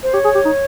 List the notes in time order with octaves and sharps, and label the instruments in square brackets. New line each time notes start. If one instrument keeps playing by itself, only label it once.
[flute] C5
[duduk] G4 [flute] C#5
[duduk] G#4
G4
D#4